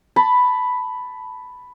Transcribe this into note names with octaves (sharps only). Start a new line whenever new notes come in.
A5 B5